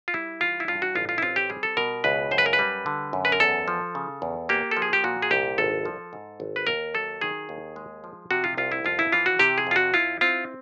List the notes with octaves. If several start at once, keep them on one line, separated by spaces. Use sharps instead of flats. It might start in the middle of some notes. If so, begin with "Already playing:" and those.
F4
G3 E4
E3 F4
E4
G2 F4
F#4
A1 F4
F4
E4
C4 F4
G4
G3 G#4
A4
B2 A#4
C#2 B4
F#2 C5
B4
A#4
B4
G3
D3
F#2
B4
A#4
E2 A4
F3
C#3
E2
A#3 G4
A4
F3
G#4
G4
A#2 F#4
G#4
C2 G4
G#1 A4
F3
G#2
G#1
B4
D#2 A#4
F#3 A4
D#3 G#4
D#2
G#3
F3
C3 F#4
F4
C2 F4
E4
F2 F4
E4
E3 F4
F#4
C3 G4
G#4
F2 F4
F#4
E4 F4
C4 F4